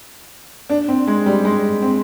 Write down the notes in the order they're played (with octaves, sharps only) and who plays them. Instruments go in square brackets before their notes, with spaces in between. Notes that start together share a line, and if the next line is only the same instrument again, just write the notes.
[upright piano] D4
C4
G#3
G3
G#3
C4